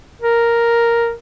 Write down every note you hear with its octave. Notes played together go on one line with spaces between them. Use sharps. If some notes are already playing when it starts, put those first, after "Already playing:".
A#4